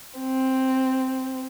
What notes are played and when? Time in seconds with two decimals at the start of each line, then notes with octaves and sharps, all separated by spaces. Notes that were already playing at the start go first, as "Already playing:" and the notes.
0.19 C4